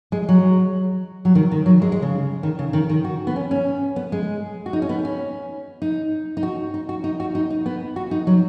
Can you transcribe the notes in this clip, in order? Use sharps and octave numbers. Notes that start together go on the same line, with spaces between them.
G#3
F#3
F#3
D#3
D#3
F#3
G#3
G#3
C#3
D#3
C#3
D#3
D#3
F#4
B3
C#4
C#4
B3
G#3
F#4
D#4
C#4
B3
C#4
D#4
D#4
F#4
D#4
F#4
D#4
F#4
D#4
D#4
B3
F#4
D#4
F#3